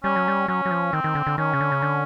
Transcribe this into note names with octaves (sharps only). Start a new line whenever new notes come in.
G3 C#4
F#3
G3
F#3 C#4
F#3
F3
D#3 C4
D#3
D3
D3
D#3 C#4
C#3
D3
C#3
D3